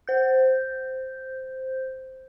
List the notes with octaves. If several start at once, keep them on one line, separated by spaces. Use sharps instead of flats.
C5 G6